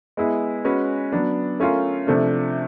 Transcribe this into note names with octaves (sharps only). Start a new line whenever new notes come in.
G#3 B3 E4 G#4
G#3 C#4 F#4 B4
F#3 B3 D4
A3 C#4 F4 A#4
C3 F3 A3 D4